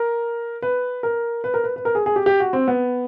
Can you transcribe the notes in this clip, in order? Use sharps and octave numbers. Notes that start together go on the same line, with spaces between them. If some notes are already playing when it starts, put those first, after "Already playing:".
Already playing: A#4
B4
A#4
B4
A#4
B4
B4
A#4
G#4
G#4
G4
G4
F#4
C4
B3